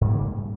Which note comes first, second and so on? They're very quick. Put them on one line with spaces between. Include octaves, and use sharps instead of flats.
G#2 G3 A#3 C#3